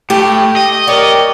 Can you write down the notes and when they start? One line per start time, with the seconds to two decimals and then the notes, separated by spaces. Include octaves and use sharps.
0.10 A2 G4
0.56 D#5
0.87 G4 A#4 C#5 D5